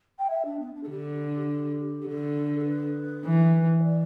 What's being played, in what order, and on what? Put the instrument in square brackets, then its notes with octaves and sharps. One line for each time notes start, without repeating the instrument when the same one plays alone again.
[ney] G5
E5
D4
B3
D4
A4
[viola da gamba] D3 [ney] G4
[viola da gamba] D3 [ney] A4
[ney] A4
B4
[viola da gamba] E3
[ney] B4
D5